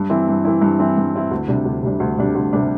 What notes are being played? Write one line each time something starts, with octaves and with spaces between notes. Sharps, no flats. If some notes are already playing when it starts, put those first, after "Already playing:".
Already playing: G2
E3 C4 E4
G2
E3 C4 E4
G2
E3 C4 E4
G2
E3 C4 E4
D2
C3 G3 D4
D2
C3 G3 D4
D2
C3 G3 D4
D2
C3 G3 D4